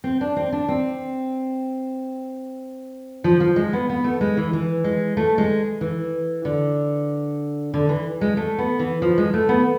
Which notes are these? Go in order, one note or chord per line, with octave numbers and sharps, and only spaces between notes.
C4
D4
C4
D4
C4
F3
F3
G#3
B3
B3
A3
G#3
E3
E3
G#3
A3
G#3
E3
D3
D3
E3
G#3
A3
B3
E3
F3
G#3
A3
B3